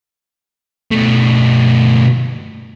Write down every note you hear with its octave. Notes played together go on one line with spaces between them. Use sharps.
B2 A3